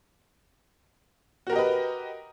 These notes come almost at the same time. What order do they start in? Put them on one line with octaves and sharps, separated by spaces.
F#4 A#4 G4 D#5 B4